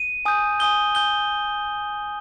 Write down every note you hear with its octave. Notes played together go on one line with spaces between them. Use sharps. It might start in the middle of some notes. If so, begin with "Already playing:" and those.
Already playing: D#7
G#5 D#6 G6
G#5 D#6 G6 G7
G#5 D#6 G6 G7